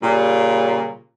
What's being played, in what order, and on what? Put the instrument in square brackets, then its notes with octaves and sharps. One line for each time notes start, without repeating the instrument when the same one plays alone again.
[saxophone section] A#2 C#3 G3